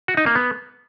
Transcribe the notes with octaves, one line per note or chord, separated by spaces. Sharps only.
F#4
D#4
A#3
B3